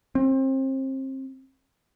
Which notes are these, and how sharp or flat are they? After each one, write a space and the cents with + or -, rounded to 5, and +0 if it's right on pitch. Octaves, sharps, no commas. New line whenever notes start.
C4 +30